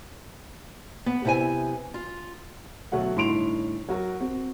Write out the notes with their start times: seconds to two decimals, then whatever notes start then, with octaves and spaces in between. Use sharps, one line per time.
1.06 B3
1.25 C3 B3 E4 G5 G#5
1.94 F4
2.92 D1 B2 F#3 A3 F#4 F#5
3.16 G1 A2 D#4 C6 D7 F7
3.89 F#3 F#4 A#4
4.21 C4 F#4